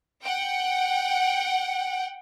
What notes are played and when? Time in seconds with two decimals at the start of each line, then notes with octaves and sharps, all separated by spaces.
0.24 F#5 G5